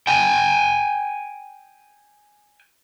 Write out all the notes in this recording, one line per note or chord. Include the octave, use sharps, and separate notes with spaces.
G5 G#5